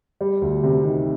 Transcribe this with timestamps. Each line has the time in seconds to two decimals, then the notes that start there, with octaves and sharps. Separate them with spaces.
0.21 G3
0.41 D2
0.63 C3
0.84 D#3